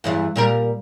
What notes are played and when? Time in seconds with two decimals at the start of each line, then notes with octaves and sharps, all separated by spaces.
0.04 E2 G2 E3
0.36 A#2 G3 A#4